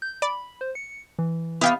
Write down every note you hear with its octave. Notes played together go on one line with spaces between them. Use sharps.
G6
D5 B5
C5
C#7
E3
B3 E4 G4 F5 G5